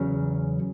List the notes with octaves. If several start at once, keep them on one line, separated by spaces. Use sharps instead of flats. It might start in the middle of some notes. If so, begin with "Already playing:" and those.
Already playing: E2 C#3 F#3 C#4